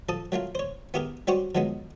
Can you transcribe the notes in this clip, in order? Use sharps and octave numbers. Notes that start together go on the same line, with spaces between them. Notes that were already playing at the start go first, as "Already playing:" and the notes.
F3 A4 A5 D#6
F#3 A3 A#3 F4
C5 C#5
B3 E4 G4 G#4 A#4
G3 C#4 F#4 G4 C5 C#6
F3 F#3 G#3 B3 D#4